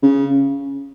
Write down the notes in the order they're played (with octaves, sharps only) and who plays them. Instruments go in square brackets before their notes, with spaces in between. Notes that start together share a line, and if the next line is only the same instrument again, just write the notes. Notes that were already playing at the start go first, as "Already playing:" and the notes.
[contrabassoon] C#3